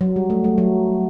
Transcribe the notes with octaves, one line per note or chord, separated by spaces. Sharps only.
F#3
G3
A3
A3
F#3